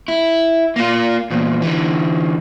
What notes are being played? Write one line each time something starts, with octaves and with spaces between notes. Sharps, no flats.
E4
A#3 F4
E2 A#2
D3 E3